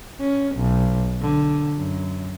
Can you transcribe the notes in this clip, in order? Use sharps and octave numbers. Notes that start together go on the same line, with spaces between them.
C#4
B1
D3
F#2